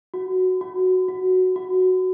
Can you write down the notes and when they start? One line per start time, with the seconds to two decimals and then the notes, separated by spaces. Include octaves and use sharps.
0.14 F#4
0.61 F#4
1.09 F#4
1.56 F#4